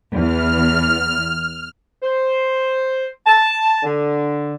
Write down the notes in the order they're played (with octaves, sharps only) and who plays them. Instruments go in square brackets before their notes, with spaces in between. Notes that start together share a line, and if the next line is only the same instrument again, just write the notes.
[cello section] E2 E3 B3 [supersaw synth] F6
[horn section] C5
A5
D3